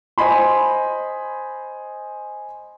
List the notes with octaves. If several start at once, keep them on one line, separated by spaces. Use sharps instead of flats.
C5 D#5 G#5 B5 C6